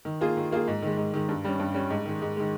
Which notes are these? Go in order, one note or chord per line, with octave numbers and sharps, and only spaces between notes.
D#3
A#3 F4 G#4
D#3
A#3 F4 G#4
G#2
D#3 G#3
G#2
D#3 G#3
G2
G3 C#4
G2
G3 C#4
G#2
D#3 G#3
G#2
D#3 G#3